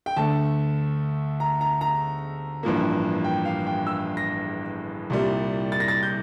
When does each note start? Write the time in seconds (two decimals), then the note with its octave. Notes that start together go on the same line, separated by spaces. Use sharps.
0.06 G5
0.16 D2 D3 A3 A5
1.40 A#5
1.61 A#5
1.81 A#5
2.63 A1 G2 F3 A#3
3.24 G5
3.45 F5
3.67 G5
3.87 E6
4.17 A#6
5.10 C2 A#2 G3
5.72 A6
5.80 A#6
5.88 A6
6.03 G6